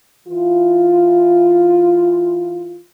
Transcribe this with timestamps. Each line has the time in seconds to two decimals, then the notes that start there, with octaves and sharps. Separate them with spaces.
0.27 E3 F4